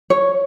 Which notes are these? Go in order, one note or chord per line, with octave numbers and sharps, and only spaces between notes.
C#5